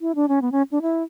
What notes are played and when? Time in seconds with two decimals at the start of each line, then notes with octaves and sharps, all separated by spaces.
0.01 E4
0.15 D4
0.28 C#4
0.42 B3
0.52 C#4
0.72 D4
0.82 E4